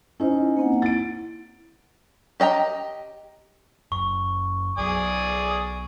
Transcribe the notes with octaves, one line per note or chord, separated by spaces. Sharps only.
C#4 D#4 E4 C5
A#3 C4 F#5
E4 A6 D7
G4 D#5 G5 A#5
F#1 C#6
B1 F#3 D5 G#5 D#6